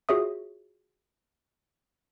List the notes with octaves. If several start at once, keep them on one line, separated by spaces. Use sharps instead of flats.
F4 F#4 G#4 C#5 E5 D#6